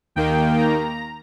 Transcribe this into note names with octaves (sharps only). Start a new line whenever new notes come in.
D#2 D#3 A#3 G5
A#5